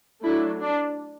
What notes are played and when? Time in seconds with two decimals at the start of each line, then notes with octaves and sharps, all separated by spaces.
0.23 F#3 A3 D4 E4
0.60 D4